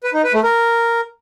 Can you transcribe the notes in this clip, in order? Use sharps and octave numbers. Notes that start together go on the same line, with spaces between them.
B4
D#4
B4
A3
A#4